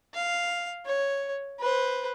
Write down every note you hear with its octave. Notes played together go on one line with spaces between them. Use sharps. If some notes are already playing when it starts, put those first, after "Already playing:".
F5
C#5
B4 C5